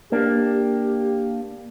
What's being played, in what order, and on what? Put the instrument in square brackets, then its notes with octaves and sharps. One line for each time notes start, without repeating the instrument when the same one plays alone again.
[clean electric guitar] A#3 D4 [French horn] G4